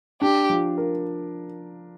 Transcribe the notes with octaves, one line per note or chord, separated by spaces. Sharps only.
D4 G4
F3
A#4